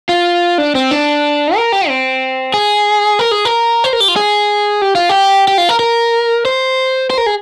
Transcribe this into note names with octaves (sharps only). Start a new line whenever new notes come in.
F4
D4
C4
D4
A#4
G4
C4
G#4
A#4
G#4
A#4
C5
A#4
G4
F4
G#4
G4
F4
G4
G4
F4
A#4
A#4
C5
C5
A#4
G#4